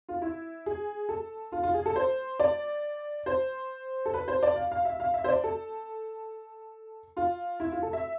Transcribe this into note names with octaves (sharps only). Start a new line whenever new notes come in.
F4
E4
G#4
A4
F4
F4
G#4
A4
C5
D5
C5
A4
B4
C5
D5
F5
F5
E5
F5
E5
C5
D5
A4
F4
E4
F4
A4
E5